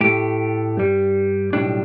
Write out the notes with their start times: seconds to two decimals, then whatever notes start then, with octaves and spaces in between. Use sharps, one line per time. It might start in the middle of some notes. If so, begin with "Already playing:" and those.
0.01 A2 A3 G4
0.77 G2 G3
1.53 B1 A2 G3 D4